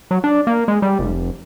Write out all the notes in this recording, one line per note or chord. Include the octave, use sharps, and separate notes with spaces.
F#3
D4
A#3
G#3
G3
F1